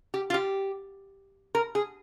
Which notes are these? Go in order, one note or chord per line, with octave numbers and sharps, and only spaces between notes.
G4
F4
G4
A#4
G#4